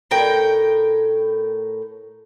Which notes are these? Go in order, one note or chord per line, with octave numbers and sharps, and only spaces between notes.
A2 A#4 G5